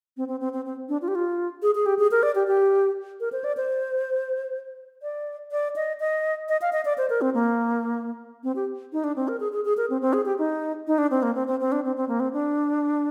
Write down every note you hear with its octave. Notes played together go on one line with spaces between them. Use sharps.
C4
C4
C4
C4
C4
D4
F4
G4
F4
G#4
G#4
G4
G#4
A#4
D5
G4
G4
A#4
C5
D5
C5
D5
D5
D#5
D#5
D#5
F5
D#5
D5
C5
A#4
C4
A#3
C4
G4
D#4
D4
C4
A#4
G#4
G#4
G#4
A#4
C4
C4
G#4
G4
D#4
D#4
D4
C4
A#3
C4
C4
C4
D4
C4
C4
A#3
C4
D4